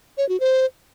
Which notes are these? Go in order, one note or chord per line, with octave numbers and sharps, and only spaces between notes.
C#5
F#4
C5